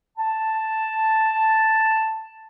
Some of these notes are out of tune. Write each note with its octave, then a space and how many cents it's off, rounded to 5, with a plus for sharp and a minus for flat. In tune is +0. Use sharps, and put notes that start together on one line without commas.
A5 +0